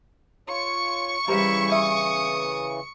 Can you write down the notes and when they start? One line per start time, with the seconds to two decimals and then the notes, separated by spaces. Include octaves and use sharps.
0.49 F4 C#5 C#6 C#7
1.28 C#3 E3 G3 E4 G4 A#4 C5 E5
1.72 E5 D#6